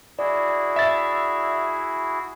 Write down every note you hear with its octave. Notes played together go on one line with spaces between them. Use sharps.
E4 F#4 G#4 D5
E5 A6